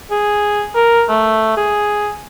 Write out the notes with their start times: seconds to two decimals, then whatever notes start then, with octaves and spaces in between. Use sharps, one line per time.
0.11 G#4
0.75 A#4
1.09 A3
1.57 G#4